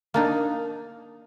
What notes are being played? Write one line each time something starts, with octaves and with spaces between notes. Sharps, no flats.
A#3 D4 D#4